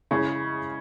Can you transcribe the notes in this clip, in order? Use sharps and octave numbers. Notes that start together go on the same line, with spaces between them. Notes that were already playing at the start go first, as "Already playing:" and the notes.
C#3 G#3 C#4 E4 G#4